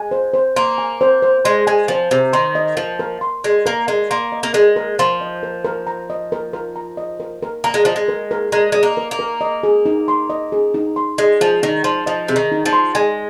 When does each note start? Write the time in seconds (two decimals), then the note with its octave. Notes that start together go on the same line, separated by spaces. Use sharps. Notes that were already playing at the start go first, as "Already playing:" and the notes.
Already playing: G#3 G#5
0.11 C5
0.34 C5
0.56 A#3 C6
0.78 G#5
1.01 C5
1.23 C5
1.45 G#3 C6
1.67 G#3 G#5
1.88 F3 C5
2.11 C3 C5
2.33 D#3 C6
2.55 D#5
2.77 F3 A#4
2.99 A#4
3.21 C6
3.44 G#3 D#5
3.66 A#3 A#4
3.88 G#3 A#4
4.11 A#3 C6
4.32 D#5
4.43 A#3
4.54 G#3 A#4
4.76 A#4
4.99 F3 C6
5.21 D#5
5.43 A#4
5.65 A#4
5.87 A#5
6.10 D#5
6.32 A#4
6.53 A#4
6.76 A#5
6.97 D#5
7.20 A#4
7.43 A#4
7.64 A#3 A#5
7.74 G#3
7.85 F3 D#5
7.96 G#3
8.08 A#4
8.31 A#4
8.52 G#3 A#5
8.72 G#3 D#5
8.83 A#3
8.97 A#4
9.11 A#3
9.19 A#4
9.41 D#5
9.63 G#4
9.86 D#4
10.08 C6
10.30 D#5
10.52 G#4
10.74 D#4
10.96 C6
11.18 G#3 D#5
11.41 F3 G#4
11.63 D#3 D#4
11.84 F3 C6
12.06 F3 D#5
12.28 C3 G#4
12.36 D#3
12.52 D#4
12.66 F3
12.73 C6
12.95 G#3 G#5